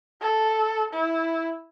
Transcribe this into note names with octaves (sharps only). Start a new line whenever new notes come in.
A4
E4